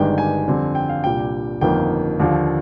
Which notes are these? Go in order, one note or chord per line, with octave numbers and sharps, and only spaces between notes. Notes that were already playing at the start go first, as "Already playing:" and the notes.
Already playing: G1 G2 D#3 G#3 D4 G5
G#5
F2 D3 G3 C4
G5
F5
C2 A#2 G3 D4 G5
G1 F2 D#3 A#3 G5
D#2 D3 F3